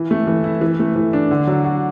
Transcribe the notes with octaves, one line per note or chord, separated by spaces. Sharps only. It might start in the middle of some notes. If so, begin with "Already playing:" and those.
Already playing: E3
A3
E3
E4
E3
A3
E3
D4
D3
F#3
F#4